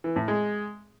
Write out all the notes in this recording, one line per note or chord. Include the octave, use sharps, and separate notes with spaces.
E3
A2
G#3